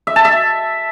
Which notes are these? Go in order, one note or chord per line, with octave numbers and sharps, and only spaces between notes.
E5
A5
E5